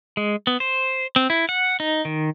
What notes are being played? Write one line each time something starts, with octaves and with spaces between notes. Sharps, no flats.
G#3
B3
C5
C4
E4
F#5
D#4
D#3